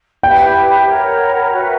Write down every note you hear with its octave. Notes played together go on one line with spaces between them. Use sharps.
E4 G4 B4 E5 G5
A#4 C#5 F#5 B5
F#4 B4 E5